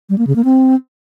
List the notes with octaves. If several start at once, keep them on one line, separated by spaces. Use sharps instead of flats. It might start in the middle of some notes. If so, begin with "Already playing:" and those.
G3
A#3
C#3
A#3
C4